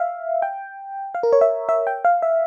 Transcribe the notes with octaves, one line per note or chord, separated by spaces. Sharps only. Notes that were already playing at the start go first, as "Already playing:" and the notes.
Already playing: E5 F5
G5
F5
A#4
C#5
E5
E5
G5
F5
E5